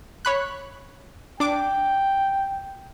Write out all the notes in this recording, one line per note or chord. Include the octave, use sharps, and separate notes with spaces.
C#5 B5 F#6
D4 G5 D6